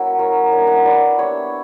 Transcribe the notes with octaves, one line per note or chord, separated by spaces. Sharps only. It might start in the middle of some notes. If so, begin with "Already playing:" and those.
Already playing: F#3 A#3 C#4 E4 F#4 E5
A#4 C#5
A#3 D4 A#4 C#5
F#5
E5
B4 D5
G3 B3 D4 C#5 E5